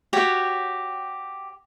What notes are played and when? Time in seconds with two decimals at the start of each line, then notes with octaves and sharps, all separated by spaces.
0.13 F#4 G4 C#5 G5